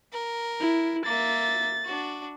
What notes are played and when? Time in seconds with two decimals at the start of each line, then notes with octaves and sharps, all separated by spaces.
0.12 A#4
0.60 E4
1.05 A#3 E5 A6
1.85 D4 F#4